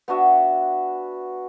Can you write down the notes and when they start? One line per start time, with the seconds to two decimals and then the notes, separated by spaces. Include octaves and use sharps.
0.08 B3 D4 F#4 E5